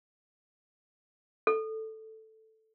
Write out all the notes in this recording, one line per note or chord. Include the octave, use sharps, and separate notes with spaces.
A4